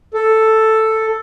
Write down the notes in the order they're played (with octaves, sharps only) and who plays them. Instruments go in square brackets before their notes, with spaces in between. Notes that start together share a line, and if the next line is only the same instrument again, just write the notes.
[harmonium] A4